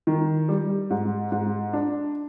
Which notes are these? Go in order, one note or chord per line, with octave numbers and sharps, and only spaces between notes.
D#3
G3
G#2
G#2
D4